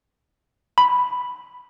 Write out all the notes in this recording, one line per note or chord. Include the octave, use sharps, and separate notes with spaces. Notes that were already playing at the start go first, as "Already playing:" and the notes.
B5